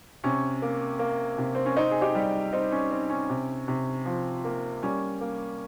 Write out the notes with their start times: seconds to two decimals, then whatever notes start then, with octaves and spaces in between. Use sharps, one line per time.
0.24 C3 C#4
0.62 A#3
0.99 A#3
1.38 C3
1.55 C4
1.66 C#4
1.76 C4 D#4
1.91 G#4
2.01 D#4 G4
2.15 G3
2.53 C4 D#4
2.72 C#4
2.91 C4
3.10 C#4
3.29 C3
3.68 C3
4.06 F3
4.44 A#3
4.83 G3 C#4
5.21 A#3